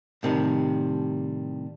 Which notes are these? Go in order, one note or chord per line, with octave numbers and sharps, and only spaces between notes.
A2 C3 D#3 G3